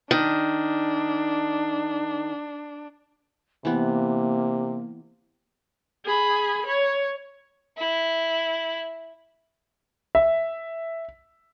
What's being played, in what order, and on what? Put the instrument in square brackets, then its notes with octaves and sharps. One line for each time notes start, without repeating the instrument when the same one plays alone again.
[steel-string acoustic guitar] D#3 [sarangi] D4
[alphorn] C3 [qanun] E3 B3 [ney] A#3
[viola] G#4 B5
C#5
[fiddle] E4
[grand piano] E5